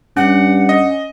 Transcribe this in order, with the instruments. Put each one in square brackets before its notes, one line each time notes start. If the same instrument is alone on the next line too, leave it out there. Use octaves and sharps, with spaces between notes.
[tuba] G2 [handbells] C#4 [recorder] F#5
[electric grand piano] D#5